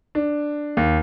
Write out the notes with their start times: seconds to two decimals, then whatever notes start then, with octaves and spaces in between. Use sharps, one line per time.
0.15 D4
0.77 D#2